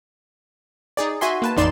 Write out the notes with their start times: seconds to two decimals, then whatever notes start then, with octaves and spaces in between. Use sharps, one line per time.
0.97 D#4 G#4 D5
1.21 F#4 E5 G#5 C6
1.42 A#3 B4 A5
1.57 A1 F2 D#4 D5 C6 E7